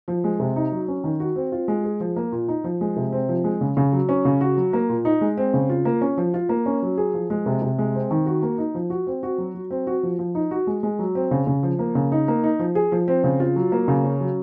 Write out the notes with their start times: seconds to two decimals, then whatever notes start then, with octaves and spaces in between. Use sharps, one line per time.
0.08 F3
0.24 G#3
0.40 C3
0.56 D#4
0.72 F#3
0.88 C#4
1.04 D#3
1.20 F#4
1.36 C4
1.52 F4
1.68 G#3
1.84 G#4
2.00 F3
2.16 A#3
2.32 A#2
2.48 D#4
2.64 F3
2.81 G#3
2.96 C3
3.12 C4
3.29 F3
3.44 G#3
3.61 C#3
3.77 C#3
3.93 F#3
4.09 C#4
4.25 C#3
4.41 F#4
4.57 F#3
4.73 A#3
4.89 A#2
5.05 D#4
5.21 G#3
5.37 C4
5.54 C#3
5.69 F4
5.85 A#3
6.01 C#4
6.17 F3
6.34 F4
6.49 A#3
6.66 C#4
6.82 F#3
6.97 G#4
7.14 F3
7.30 G#3
7.46 C3
7.62 C3
7.78 G#3
7.94 C4
8.11 D#3
8.26 F#4
8.42 A#3
8.58 D#4
8.75 F3
8.90 F#4
9.07 C4
9.23 F#4
9.38 F#3
9.55 F#3
9.71 C4
9.87 F#4
10.03 F3
10.19 F3
10.35 D#4
10.51 F#4
10.67 G#3
10.83 G#3
10.99 F#3
11.15 C4
11.31 C#3
11.47 C#3
11.63 F3
11.79 A#3
11.95 C#3
12.12 D#4
12.28 A#3
12.44 D#4
12.59 F3
12.75 G#4
12.92 F3
13.08 C4
13.24 C#3
13.40 F4
13.56 F#3
13.72 A#3
13.88 C#3
14.04 C#4
14.20 F#3